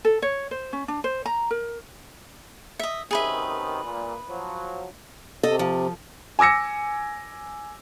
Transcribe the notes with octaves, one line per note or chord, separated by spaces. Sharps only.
A4
C#5
C5
C#4
D4
C5
A#5
A#4
D#5 E5
F#2 C3 D#3 G#4 B4 E5
A#2
F3 F#3
C3 A4 D#5
F3
G#5 D6 E6 A#6 C#7